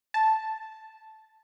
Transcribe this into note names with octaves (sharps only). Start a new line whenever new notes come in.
A5